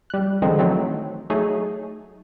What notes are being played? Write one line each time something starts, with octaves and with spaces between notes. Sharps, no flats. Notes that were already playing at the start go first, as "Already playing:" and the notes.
G3 F#6
D3 D#3 F3 G#3 C4 D#4
E3 F#3 A3 C4 D#4
F#3 A3 D#4 G#4